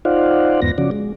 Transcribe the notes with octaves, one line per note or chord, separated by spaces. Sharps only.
D#4 F4 C5 D5 F5 F#5
E2 G#2 B3 A#6
C#3 F3 C#4 F#4 D5
G#3